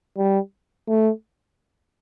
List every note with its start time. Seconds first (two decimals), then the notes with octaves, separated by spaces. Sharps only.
0.17 G3
0.89 A3